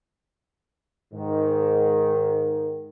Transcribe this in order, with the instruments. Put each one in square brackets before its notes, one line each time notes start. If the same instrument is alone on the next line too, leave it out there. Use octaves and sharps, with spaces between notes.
[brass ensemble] G#2 D#3